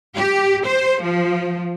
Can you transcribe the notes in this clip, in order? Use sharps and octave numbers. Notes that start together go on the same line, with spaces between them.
G4
C5
F3